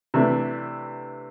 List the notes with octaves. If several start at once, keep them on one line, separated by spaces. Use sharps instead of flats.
C3 E3 A3 D4